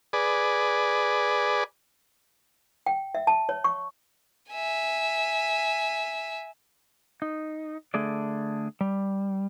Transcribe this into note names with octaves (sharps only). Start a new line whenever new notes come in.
G#4 B4 D5
G5
E5
A5
C#5
C#6
E5 G#5
D#4
D3 A3 G#4 D5
G3